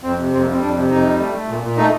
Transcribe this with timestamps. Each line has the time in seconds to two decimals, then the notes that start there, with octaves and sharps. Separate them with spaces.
0.03 F2 C4
0.18 C3
0.32 F2 C4
0.42 A#3
0.48 G3 C4
0.61 F2 D4
0.76 C3
0.91 F2 D#4
1.04 G3
1.19 A3
1.34 A3
1.49 A#2
1.63 A#2
1.77 A3 D#4